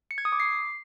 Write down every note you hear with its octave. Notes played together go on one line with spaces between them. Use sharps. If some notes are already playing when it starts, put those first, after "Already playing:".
C#7
G#6
D#6
D6
C7